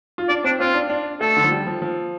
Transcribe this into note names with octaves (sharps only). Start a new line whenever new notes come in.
F4
D4 D5
C4 D4
C4 F4
D4
D4
A3 A4
D3
F3
G3
F3
F3